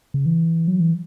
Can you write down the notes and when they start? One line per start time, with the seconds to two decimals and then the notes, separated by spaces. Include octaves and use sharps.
0.14 C#3
0.26 E3
0.68 F#3
0.80 E3